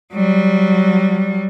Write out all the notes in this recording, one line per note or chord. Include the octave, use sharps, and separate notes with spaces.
F#3 G3